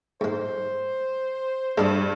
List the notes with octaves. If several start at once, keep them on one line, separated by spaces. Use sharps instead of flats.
G#2 G#3 C5
G2 G#3 G#4 D5